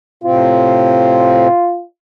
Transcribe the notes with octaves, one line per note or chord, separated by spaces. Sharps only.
A2 C3 C4 F4